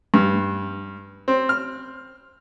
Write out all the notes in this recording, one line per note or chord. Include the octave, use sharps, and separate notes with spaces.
G2
C4
F6